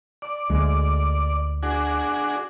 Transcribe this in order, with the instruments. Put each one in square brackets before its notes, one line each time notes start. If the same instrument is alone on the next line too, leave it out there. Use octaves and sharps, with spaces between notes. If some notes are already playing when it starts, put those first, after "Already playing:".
[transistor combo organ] D5
[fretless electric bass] D2 G#3
[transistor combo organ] D4 F#4 G#4